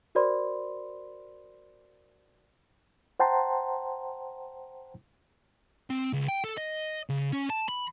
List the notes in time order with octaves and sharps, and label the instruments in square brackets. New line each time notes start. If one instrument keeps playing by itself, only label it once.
[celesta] F#4 A#4 C5 D5 B5 C6
[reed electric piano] C5 F#5 G5 A5 A#5 C6
[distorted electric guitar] C4
C#2
G5
A4
D#5
C#3
C#4
A5
B5